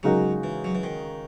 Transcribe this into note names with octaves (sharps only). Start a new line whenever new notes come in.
C#3 F#3 G#3 D#4 F#4 A#4
E3
F#3
E3
D#3